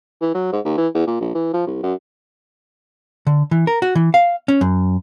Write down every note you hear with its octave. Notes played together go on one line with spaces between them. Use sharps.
E3
F#3
G#2
D#2
E3
E2
A#2
A#1
E3
F3
C2
F#2
D3
E3
A#4
F#4
E3
F5
C#4
F#2